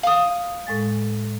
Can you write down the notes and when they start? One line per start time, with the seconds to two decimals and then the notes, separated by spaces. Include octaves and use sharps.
0.03 F5 D#6
0.67 A2 G#3 A6